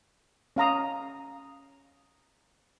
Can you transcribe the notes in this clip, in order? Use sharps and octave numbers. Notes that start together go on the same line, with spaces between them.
C#4 F5 A#5 D#6